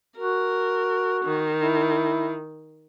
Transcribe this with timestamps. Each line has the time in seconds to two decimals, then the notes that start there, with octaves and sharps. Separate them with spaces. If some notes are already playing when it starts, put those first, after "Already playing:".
0.18 F#4 A#4
1.25 D#3
1.62 E4